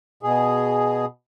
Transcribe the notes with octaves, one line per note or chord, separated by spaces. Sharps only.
B2 G#4